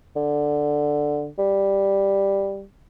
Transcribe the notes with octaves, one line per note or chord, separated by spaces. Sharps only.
D3
G3